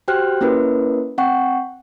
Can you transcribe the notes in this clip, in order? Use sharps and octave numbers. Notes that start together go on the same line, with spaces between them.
F#4 G4 C5 G5 F6 F#6
A#3 C#4 E4 A#4 B4
C4 F#5 G5 C#6